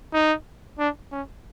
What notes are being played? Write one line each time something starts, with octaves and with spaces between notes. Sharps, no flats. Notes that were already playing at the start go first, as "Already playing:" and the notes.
D#4
D4
C#4